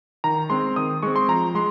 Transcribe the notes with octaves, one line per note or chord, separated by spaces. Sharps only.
D#3 A#5
G#3 C4 C6
D#3 D#6
G#3 C4 C#6
C6
F3 A#5
G#3 C6